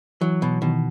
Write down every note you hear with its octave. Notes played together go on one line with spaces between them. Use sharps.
E3 F#3
B2
B2 D#3